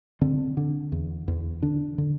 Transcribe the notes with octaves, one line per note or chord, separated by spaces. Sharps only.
D3 C4
D3
E2
E2
D3 D4
D3